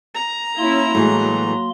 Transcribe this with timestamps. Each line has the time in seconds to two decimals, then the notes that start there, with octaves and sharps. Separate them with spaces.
0.15 A#5
0.58 A#3 C#4 E4 C6
0.95 A2 E3 F#3 G#3